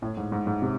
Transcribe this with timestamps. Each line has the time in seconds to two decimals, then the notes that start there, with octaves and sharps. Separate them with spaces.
0.02 A2
0.17 G#2
0.32 G#2
0.47 G#2
0.62 C3